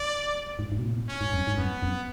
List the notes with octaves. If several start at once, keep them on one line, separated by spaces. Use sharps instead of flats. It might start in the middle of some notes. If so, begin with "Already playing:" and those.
Already playing: D5
G#2
G#2
B2
A2
B2
A2
C#4
G#2
F#2
G#2
F#2 B3
F#2